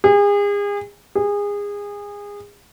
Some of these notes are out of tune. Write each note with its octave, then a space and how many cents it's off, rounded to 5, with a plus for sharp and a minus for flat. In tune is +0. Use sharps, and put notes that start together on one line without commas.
G#4 -35
G#4 -25